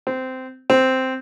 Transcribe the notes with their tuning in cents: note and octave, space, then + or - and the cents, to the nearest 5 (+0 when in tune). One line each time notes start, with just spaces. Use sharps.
C4 -15
C4 -5